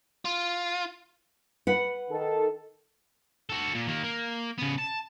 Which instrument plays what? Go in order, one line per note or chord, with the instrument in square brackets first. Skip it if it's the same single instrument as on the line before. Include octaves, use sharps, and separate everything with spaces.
[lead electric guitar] F4
[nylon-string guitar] B4 F#5
[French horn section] D#3 A4
[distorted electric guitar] F#4 A4
A#2
D#3 A#3
A#3
C#3 B3
A5